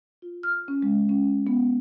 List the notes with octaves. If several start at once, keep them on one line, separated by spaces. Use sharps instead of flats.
F4
F6
C#4
G#3
C#4
B3